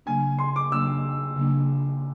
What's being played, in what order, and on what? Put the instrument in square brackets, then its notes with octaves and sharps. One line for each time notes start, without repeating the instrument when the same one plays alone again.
[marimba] C#3 F#3 A#3 D4 [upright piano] G#5
[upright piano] C6
D6
[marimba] C#3 F#3 A#3 D4 [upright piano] E6
[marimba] C#3 F#3 A#3 D4